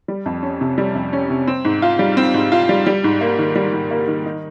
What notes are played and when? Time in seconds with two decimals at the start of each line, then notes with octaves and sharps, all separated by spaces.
0.08 G3
0.26 F2
0.43 C#4
0.61 C3
0.78 G3
0.95 F2
1.13 C#4
1.30 C3
1.47 C4
1.65 G#2
1.82 F4
1.99 G3
2.17 C4
2.34 G#2
2.52 F4
2.69 G3
2.87 G3
3.04 G#2
3.21 A#3
3.38 D#3
3.56 G3
3.73 G#2
3.91 A#3
4.08 D#3
4.25 D#4